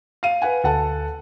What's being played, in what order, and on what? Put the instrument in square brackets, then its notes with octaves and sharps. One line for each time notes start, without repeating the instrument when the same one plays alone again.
[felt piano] F5 D#7
B4 F#5 G#5
[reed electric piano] D2 [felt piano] A4 F#5 A5